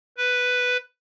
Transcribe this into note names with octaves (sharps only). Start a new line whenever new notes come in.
B4